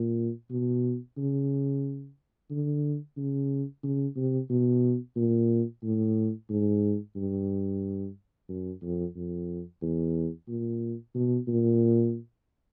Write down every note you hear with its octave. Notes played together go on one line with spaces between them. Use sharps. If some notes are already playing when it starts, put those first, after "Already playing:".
Already playing: A#2
B2
C#3
D3
C#3
C#3
C3
B2
A#2
A2
G#2
G2
F#2
F2
F2
E2
A#2
B2
A#2